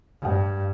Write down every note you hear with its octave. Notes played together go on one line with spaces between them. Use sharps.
G2